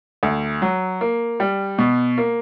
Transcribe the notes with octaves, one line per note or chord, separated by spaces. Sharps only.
D2
F#3
A#3
G3
B2
A#3